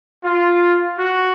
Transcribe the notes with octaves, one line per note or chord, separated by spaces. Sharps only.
F4
F#4